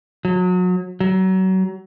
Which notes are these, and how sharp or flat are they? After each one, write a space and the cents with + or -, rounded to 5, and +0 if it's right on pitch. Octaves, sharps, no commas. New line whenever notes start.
F#3 -30
F#3 +30